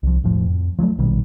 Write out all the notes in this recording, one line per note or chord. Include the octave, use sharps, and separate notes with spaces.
C2 F3
E1 A2 F3
F2
F3 F#3 G#3 A3
A#1 B2 D#3 G3